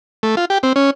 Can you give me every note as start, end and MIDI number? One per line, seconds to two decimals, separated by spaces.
0.23 0.35 57
0.37 0.45 65
0.50 0.58 67
0.63 0.73 60
0.76 0.90 61